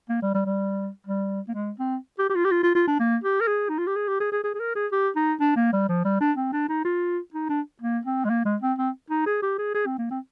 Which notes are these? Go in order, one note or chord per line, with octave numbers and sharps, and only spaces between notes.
A#3
G3
G3
G3
G3
A#3
G#3
C4
G4
G4
F4
G4
F4
F4
F4
D4
A#3
G4
A#4
G#4
D#4
F4
G4
G#4
G4
G#4
G#4
G#4
G#4
A#4
G#4
G4
D#4
D4
A#3
G3
F3
G3
D4
C4
D4
D#4
F4
D#4
D4
A#3
C4
G#3
A#3
G#3
C4
C4
D#4
G#4
G4
G#4
G#4
C4
A#3
C4